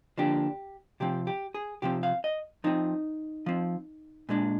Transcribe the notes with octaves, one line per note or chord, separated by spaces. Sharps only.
D3 F3 A#3 D4 G4
C3 F3 C4 G4
G4
G#4
C3 F3 C4 G4
F5
D#5
F3 C4 D#4
F3 C4
A#2 G#3 D4